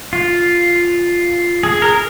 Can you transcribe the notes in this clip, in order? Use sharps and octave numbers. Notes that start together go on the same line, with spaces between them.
F4
G#4
A#4